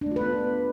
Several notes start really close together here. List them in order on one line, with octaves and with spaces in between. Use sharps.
D4 A3 F4 B4 B3